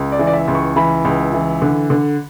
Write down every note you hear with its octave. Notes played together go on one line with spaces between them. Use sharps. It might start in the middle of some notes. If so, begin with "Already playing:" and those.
Already playing: C#2
D5
E3
D5
E5
C#2
C#6
E3 B5
C#2
E3
D3
D3